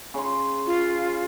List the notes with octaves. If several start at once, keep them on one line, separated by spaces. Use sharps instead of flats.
C#3 C6
F4